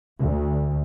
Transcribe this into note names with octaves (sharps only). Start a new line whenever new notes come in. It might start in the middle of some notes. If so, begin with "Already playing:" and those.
D2